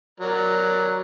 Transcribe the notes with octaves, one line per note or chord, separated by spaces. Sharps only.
F#3 A#4 D5